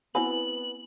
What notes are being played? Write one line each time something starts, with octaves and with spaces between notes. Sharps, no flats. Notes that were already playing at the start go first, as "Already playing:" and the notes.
B3 C4 E4 F#4 B4 G#5 F#7